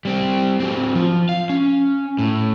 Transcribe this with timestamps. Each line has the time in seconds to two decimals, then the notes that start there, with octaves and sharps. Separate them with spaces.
0.05 G3 C4
0.60 F#3 C4
0.95 F3
1.29 F5
1.50 C#4
2.19 A2